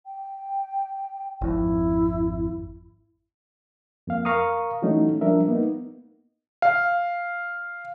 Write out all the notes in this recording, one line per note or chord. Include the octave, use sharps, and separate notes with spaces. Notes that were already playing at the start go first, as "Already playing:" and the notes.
G5
G#1 F2 E4
F2 A#3 F5
A#4 F5 A#5 C#6 D#6
E3 F#3 A3 C#4 D#4
F3 G3 D4 A#4 E5
A#3 B3 D#4
F5